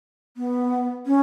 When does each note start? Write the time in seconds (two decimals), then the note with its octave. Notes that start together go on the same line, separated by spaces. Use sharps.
0.37 B3
1.06 C#4